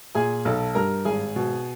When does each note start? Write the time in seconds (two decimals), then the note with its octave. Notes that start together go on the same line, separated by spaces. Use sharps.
0.15 A#2 G#4 G#5
0.45 B1 A4 A5
0.75 G2 A#4 A#5
1.05 G#1 G#4 G#5
1.36 B2